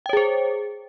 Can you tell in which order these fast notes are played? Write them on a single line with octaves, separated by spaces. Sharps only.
G5 C#5 G#4 C5